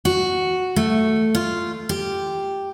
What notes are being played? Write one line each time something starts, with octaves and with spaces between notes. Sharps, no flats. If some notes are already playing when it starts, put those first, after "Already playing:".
F#4
A3
F4
G4